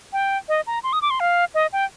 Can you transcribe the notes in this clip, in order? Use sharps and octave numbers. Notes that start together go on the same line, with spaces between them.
G5
D#5
A#5
C6
D#6
D6
C6
F5
D#5
G5